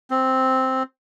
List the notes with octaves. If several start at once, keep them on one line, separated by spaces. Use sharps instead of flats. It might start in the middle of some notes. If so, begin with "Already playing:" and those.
C4